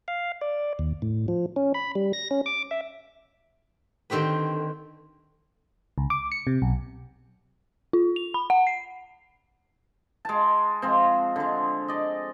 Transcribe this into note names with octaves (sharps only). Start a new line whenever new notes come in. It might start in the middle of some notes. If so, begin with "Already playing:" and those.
F5
D5
D#2
A2
F3
C#4
B5
G3
A#6
C#4
D6
E5
D3 D#3 C4 G4 B4
C#2
D6
C#7
C3
B1
F4
F7
B5
F#5
C7
G#3 A5
F3 G#3 C4
D3 G#3
D5 D#5